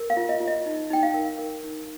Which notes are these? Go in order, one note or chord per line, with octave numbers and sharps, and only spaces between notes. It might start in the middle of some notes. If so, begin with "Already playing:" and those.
Already playing: A#4
F5
F4
D#5
F4
D#5
D#4
D#4 G5
F5
A#4
A#4
D#4